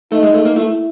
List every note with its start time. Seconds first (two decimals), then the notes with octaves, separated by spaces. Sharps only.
0.12 A3 D#4
0.23 G#3
0.34 A3
0.45 A#3
0.56 A3 E4